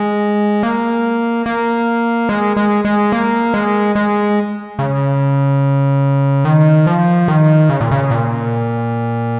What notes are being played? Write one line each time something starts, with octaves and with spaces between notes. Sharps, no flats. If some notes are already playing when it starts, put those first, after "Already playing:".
Already playing: G#3
A#3
A#3
G#3
G#3
G#3
A#3
G#3
G#3
C#3
D#3
F3
D#3
C#3
A#2
C#3
A#2